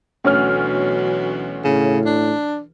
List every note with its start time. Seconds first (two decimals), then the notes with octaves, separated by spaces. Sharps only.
0.24 D2 B2 E3 F#3 C#4 F6
1.65 A2 C#3
2.06 D4